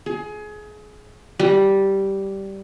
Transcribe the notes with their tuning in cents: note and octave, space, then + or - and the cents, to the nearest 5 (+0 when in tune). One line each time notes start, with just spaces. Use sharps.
G#4 +25
G3 -10